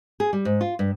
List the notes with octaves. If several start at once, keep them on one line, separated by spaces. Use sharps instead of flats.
G#4
G3
G#2
F4
G2